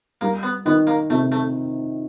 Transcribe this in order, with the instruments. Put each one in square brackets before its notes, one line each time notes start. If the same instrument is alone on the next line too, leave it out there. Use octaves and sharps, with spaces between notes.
[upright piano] G3 [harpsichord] A#3
[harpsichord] B3
[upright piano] D#3 [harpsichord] B3
[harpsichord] A#3
[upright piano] C3 [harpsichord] A3
[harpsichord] A3